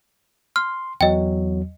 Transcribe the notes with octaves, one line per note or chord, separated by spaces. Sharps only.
C6 F6
E2 F#3 D#5 G5